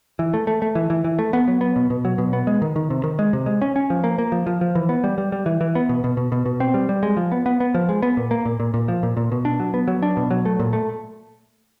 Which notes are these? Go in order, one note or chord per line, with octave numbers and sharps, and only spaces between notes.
E3
A3
A3
A3
E3
E3
E3
A3
B3
F#3
B3
B2
B2
F#3
B2
B3
G#3
D#3
D#3
C3
D#3
G#3
C3
G#3
C#4
C#4
F3
A#3
A#3
F3
F3
F3
E3
B3
G3
G3
G3
E3
E3
B3
B2
B2
B2
B2
B2
C4
G3
G3
G#3
F3
B3
B3
B3
F3
G#3
B3
A#2
A#3
A#2
A#2
A#2
F3
A#2
A#2
B2
D4
F#3
B3
F#3
D4
B2
F#3
A3
A#2
A3